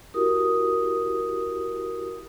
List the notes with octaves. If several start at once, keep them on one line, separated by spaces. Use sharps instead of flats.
E4 F#4 G4 A#4 D#6